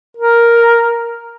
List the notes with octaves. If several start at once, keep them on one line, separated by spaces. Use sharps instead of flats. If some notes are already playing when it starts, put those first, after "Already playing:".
A#4